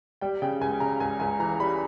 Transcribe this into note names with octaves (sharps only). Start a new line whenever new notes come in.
G3 G5
C#3 G5
C#2 G#5
C#3 A#5
C#2 G#5
C#2 G#5
E3 A#5
G3 B5